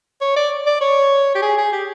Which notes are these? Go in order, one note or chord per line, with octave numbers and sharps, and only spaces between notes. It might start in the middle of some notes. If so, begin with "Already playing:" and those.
C#5
D5
D5
C#5
G4
G#4
G#4
G4